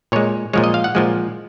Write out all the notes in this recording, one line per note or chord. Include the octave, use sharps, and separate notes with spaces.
A#2 G#3 C#5
A#2 F3 G#3 C#5
D#5
F5
F#5
A#2 F3 G#3